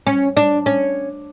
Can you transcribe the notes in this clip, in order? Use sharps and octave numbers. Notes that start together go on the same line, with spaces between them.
C#4
D4
C#4